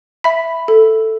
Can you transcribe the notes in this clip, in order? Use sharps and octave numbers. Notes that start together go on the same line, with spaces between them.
E5 B5 B6
A4